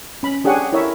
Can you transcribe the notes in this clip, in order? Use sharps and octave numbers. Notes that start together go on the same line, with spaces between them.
C#4 B5
D4 G4 G#4 C#5 F#5 G#5
E4 A#4 C#5 E5